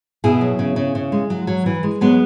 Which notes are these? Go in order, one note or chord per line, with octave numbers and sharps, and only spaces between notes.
B2 E4 G#4
F#3
C#3
C#3
C#3
G#3
F#3
F#3
E3
G#3
F#3 G#3 B3